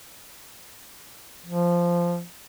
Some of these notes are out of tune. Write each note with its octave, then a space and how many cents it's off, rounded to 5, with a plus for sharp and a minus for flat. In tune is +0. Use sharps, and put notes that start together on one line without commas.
F3 -10